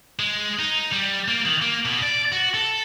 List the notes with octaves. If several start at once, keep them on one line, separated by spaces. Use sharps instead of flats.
G#3
D#4
G3
A#3
D#3
A#3
B2
D5
F#4
A4